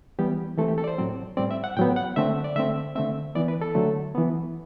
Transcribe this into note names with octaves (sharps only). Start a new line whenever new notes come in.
E3 G3 B3 G4
E3 A3 C4 A4
G4
A4
D5
C5
A2 F#3 C4
A2 G3 C4 D5
E5
F#5
A2 F#3 B3 G5
F#5
D3 A3 C4 E5
D5
D3 A3 C4 E5
D3 A3 C4 E5
E3 B3 D5
B4
A4
D3 F#3 A3
E3 B3